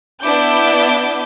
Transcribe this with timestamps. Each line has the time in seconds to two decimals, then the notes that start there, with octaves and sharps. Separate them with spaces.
0.22 B3 D4 E4 D6 G6